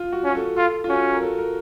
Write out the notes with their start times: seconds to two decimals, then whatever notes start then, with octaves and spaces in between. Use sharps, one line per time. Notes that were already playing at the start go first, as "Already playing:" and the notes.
Already playing: F4
0.13 F#4
0.24 C#4
0.30 F#4
0.35 A4
0.56 F4 A4
0.84 F4
0.89 C#4 F#4
1.13 A#4
1.22 A4
1.39 A#4